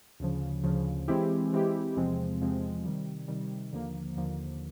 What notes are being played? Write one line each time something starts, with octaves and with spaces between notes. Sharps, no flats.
D2 C#3 F3
D2 C#3 F3
E3 G#3 C4 E4 G4
E3 G#3 C4 E4 G4
E2 C3 F3 G#3 C4
E2 C3 F3 G#3 C4
C3 D#3 G3
C3 D#3 G3
D#2 D3 F3 A#3
D#2 D3 F3 A#3